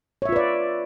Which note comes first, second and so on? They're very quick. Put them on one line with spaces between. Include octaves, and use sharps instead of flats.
C#5 E5 F4 B4 D5